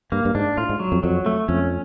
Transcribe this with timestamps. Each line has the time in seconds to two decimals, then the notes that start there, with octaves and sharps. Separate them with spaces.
0.12 G2 A#3
0.25 G2
0.35 G#2 D4
0.57 A2 F4
0.69 G#2
0.80 F#3
0.92 F2
1.03 F2 F#3
1.26 A3
1.48 F2 C#4